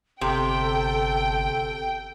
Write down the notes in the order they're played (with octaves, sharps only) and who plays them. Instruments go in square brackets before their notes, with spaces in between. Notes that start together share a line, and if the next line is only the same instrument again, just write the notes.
[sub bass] G1 [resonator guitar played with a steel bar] C3 [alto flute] A4 [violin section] G5